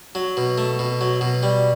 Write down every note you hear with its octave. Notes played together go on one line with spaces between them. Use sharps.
F#3
B2
A3
B2
F#3
B2
G3